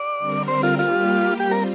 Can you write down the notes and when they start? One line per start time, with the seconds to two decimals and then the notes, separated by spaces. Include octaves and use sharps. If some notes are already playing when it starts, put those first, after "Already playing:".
Already playing: D5
0.18 D3 G3 C4 A#4
0.48 C5
0.63 F4
0.78 G3 A#3 F4 G4
1.39 G3 C4 F4 G4
1.51 A#4